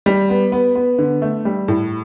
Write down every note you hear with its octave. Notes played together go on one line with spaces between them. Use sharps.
G3
B3
B3
B3
D3
A3
G3
A2